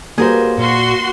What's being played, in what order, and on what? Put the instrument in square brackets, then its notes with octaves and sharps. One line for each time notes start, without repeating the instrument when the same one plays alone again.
[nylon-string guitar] G3 B3 F#4 [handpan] A#3 [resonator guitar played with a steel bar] G#4 A#4 C5
[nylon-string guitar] A#2 [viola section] F#4 C6